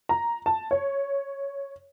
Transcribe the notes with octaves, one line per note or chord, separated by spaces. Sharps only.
A#5
A5
C#5